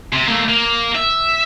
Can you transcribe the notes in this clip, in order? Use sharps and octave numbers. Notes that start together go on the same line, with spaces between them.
C3
A3 A#3
A#3
E5